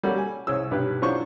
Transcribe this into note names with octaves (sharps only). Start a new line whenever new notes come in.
G3 A#3 C#4 F#4 A4
G#5
C2 C#4 G#4 E6
B1 G2 G4 B4
E3 F#3 D4 F4 C5 C#6